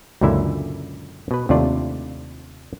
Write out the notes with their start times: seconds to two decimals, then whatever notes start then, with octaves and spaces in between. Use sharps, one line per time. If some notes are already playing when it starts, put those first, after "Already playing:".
0.21 C#2 F#2 A#2 D3 E4 E5
1.31 B2 B4
1.49 D#2 C3 A3 D4 F4 D5